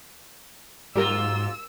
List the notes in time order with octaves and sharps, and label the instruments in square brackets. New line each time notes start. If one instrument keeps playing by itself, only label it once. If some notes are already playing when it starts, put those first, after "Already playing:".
[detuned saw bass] G#2 [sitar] F#3 A#3 F4 [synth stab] G3 G4 A#4 [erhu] E6